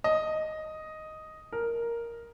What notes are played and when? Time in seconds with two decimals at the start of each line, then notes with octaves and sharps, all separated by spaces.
0.04 D#5
1.52 A#4